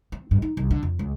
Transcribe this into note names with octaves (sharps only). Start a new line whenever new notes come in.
C4
G2
D#4
C2
D3
F2
C#2